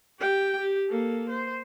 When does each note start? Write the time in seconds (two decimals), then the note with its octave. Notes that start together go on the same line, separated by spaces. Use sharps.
0.20 G4 G5
0.60 G4
0.89 A#3 A4
1.30 C5